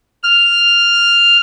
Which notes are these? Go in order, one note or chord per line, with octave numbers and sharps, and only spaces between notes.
F6